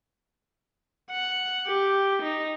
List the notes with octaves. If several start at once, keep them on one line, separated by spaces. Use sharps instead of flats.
F#5
G4
D#4